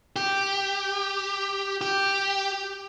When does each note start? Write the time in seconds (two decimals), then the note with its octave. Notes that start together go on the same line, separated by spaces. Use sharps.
0.16 G4
1.81 G4